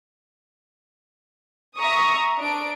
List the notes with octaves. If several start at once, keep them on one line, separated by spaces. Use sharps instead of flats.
E5 A#5 C#6 D#6
D4 D7